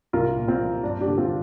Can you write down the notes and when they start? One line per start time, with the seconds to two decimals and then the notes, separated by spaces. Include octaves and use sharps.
0.13 C2 F4 A#4
0.36 A#2
0.48 C4 F4
0.60 F3
0.83 G2 D4
1.01 D4 G4
1.07 D3
1.18 C4 F4